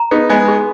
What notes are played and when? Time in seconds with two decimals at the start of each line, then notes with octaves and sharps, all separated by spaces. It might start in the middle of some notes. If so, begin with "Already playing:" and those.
Already playing: A#5
0.11 B3 D#4 G#4
0.29 G#3 B3 D#5
0.48 G#4